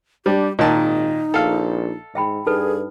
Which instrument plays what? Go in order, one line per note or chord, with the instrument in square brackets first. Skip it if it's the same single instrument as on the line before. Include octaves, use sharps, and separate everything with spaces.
[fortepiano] G3 [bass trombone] D4 [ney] G4
[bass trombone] G#1 [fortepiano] A#2 D#3 A5 [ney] D#4 [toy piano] D#5
[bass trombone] A#1 [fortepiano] A4 F5
[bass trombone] G#2 [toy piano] E5 G5 B5
[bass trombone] G2 [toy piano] D#4 A4 B4 [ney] G#4